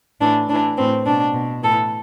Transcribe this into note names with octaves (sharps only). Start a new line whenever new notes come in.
A2 E3 D4
A2 E3 D4
A2 E3 C4
B2 D4
B2
A2 E3 A4